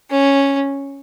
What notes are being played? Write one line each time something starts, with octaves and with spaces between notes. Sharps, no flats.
C#4